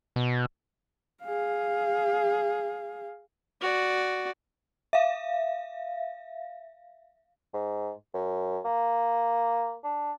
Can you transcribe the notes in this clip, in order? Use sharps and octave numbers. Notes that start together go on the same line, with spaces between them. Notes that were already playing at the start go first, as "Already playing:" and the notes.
B2
G#4 F5
F#4 D5
E5 F5
G#2
F#2
A#3
D4